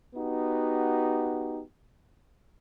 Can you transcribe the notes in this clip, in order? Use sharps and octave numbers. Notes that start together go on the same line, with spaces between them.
B3 D#4 F#4 G4